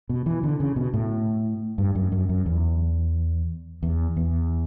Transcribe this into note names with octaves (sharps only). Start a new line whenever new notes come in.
B2
E3
D3
C#3
B2
A2
G2
F#2
F#2
F#2
E2
E2
E2